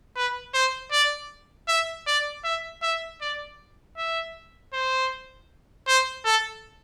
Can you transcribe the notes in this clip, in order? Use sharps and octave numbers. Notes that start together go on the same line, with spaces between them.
B4
C5
D5
E5
D5
E5
E5
D5
E5
C5
C5
A4